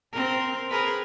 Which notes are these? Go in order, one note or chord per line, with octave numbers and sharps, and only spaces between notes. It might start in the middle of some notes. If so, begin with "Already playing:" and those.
C4 A#4
G#4 A#4 B4